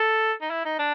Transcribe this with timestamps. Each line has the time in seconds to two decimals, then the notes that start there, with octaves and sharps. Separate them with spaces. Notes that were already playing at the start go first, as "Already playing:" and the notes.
Already playing: A4
0.42 D#4
0.51 E4
0.65 D#4
0.79 D4